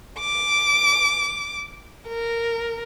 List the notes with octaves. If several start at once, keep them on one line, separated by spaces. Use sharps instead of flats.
D6
A#4